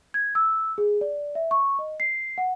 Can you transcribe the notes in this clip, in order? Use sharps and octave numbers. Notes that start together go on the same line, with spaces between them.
G#6
E6
G#4
D5
E5
C#6
D#5
C7
F#5